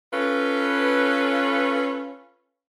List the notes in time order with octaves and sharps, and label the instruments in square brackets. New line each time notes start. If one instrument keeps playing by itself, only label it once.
[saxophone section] C#4 F4 A4 B4